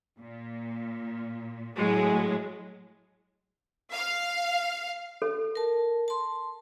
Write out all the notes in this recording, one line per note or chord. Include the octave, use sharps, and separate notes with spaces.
A#2
A2 F#3 G#3
F5
A4
A#4 A5
A5 C6